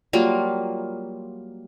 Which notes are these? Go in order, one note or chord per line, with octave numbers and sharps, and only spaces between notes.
F#3 G3 A#3 F4